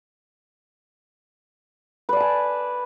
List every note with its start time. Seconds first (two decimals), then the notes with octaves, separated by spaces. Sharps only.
2.09 B4
2.13 D5
2.17 A5
2.20 G#5